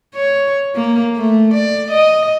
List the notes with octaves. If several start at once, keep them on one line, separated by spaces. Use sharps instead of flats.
C#5
A#3
A3
D5
D#5